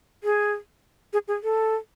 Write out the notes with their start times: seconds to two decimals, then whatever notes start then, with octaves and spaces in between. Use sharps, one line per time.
0.24 G#4
1.13 G#4
1.28 G#4
1.43 A4